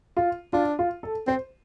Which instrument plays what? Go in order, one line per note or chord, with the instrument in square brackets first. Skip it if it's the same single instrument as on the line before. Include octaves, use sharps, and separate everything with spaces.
[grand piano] F4
[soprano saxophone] D4 [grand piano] F4
[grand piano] F4
A4
[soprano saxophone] C4 [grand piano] C5